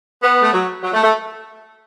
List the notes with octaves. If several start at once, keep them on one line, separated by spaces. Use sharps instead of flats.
B3
A3
F#3
F#3
A3
A3